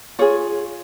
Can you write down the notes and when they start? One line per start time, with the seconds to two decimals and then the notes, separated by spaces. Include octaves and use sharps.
0.19 F4 G#4 C#5